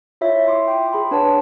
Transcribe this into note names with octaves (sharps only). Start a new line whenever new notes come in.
E4 F4 C#5 E5
E5 C6 D6
G5
G#4 B5 C6
D4 G#4 B4 C#5 F#5 A5